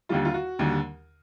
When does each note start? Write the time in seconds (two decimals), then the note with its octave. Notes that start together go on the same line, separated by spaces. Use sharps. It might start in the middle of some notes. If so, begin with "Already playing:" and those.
0.09 D#2 D3 G3 F4
0.25 F4
0.34 F#4
0.59 D#2 D3 G3